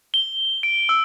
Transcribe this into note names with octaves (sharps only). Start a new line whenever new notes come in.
G7
D7
E6